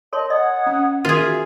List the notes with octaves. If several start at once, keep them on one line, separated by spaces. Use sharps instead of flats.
A#4 C#5 D#5 A5 C6
D#5 F#5 D#6 G#6
C#4
D#3 F4 F#4 G#4 A#4 E5